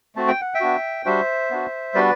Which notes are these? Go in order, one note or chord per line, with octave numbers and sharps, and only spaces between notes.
A3 C4 F#4 A5
G5
F#5
E5 G5
B3 D4 F#4
G3 D4 F#4 C5 E5
B3 D4 F#4
G3 B3 D4 F#4 B4 D5